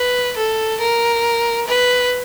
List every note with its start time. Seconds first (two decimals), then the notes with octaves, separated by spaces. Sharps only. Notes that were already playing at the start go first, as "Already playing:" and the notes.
Already playing: B4
0.37 A4
0.81 A#4
1.67 B4